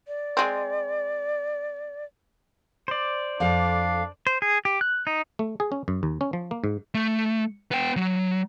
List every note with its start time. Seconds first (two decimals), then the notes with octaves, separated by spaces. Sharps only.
0.07 D5
0.37 G#3 C4
2.88 C5 D5
3.40 F2 D4 A4 F5
4.27 C5
4.42 G#4
4.65 G4
4.81 F#6
5.07 D#4
5.39 A3
5.60 G#4
5.72 C#4
5.88 F#2
6.03 D#2
6.21 C#4
6.33 F3
6.51 A#3
6.64 G#2
6.95 A3
7.71 B3 G5
7.96 F#3